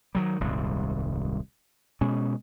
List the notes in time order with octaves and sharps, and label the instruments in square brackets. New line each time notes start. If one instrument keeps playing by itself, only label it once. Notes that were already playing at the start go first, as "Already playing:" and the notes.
[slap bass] D#3 F#3 G3
D#1 C2 G#2
B2 G#3 C#4